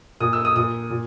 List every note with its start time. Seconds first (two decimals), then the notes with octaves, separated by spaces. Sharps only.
0.20 A#2 D#6
0.33 E6
0.45 D#6
0.56 A#2 D#6
0.90 A#2